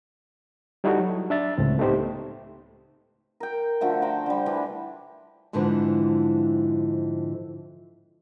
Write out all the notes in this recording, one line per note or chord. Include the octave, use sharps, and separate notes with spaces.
G3 D#4 E4 F#4 A4
F#3
D4 E5 A6
C#2 A2 C4
A3 B3 D#4 G4 C5
A#4 G5
D3 F3 A3 F#4
C5 F5 G5 A#5
D3 G3
D3 E3 A3 D4
F2 G#2 D3 E3 F3